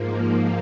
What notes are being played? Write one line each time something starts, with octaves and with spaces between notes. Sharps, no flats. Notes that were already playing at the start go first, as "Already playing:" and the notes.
Already playing: G#2 F3 A#3